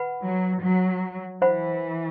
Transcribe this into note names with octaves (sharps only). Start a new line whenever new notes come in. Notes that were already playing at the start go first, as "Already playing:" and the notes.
Already playing: B4 F#5 B5
F#3
F#3
E3 C5 F#5 B5